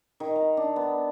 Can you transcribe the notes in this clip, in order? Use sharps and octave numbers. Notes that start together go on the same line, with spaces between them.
D#3
A#5
D4
B3